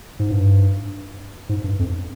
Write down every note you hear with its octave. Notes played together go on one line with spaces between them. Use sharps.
G#2
G2
G#2
G2
F2